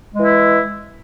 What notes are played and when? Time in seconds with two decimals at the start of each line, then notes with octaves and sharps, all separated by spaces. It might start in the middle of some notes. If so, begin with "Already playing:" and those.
0.14 G#3
0.19 E3
0.24 E4